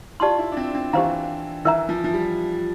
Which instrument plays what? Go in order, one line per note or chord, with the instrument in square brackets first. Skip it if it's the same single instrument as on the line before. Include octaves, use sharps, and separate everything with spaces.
[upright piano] F4 [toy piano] G4 D5 A5 C6
[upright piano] E4
D4
C4
C4
[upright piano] E3 [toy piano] G4 C5 F5 A#5
[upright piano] E3 [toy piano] A#4 E5 A#5
[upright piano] F3
F3
G3